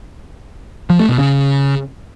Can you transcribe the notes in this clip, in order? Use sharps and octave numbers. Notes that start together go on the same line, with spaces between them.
F3
A3
B2
C#3